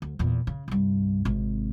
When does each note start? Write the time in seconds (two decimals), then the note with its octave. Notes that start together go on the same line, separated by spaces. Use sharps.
0.02 D2
0.19 E2 A#2
0.47 C#3
0.68 C2 G2
1.25 G#1 C3